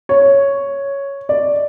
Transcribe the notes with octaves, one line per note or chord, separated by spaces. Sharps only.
C#5
D5